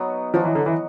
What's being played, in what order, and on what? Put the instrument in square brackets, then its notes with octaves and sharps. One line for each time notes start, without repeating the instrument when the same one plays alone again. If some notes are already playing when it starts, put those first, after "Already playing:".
Already playing: [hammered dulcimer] F#3 B3 D#4 F#4
[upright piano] F3 [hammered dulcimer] F#3 B3 D#4 F#4
[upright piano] E3
D3
E3